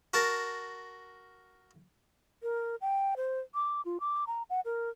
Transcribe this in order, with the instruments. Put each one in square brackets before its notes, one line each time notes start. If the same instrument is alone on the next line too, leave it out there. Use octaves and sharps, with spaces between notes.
[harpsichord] F#4 A#4 A5
[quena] A#4
G5
C5
D6
F4
D6
A#5
F#5
A#4